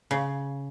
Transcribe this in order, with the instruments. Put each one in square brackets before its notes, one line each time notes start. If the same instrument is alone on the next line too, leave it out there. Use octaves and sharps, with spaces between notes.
[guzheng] C#3